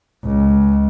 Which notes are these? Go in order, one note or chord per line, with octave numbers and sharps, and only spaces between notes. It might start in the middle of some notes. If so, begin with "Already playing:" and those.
C#2